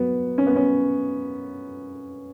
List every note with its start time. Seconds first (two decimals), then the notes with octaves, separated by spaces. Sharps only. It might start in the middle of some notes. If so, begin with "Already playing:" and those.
Already playing: F#3 B3
0.38 C#4
0.47 B3
0.56 C#4